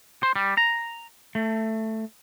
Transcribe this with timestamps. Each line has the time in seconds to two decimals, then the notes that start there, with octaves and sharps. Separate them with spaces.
0.23 C5
0.36 G3
0.57 A#5
1.35 A3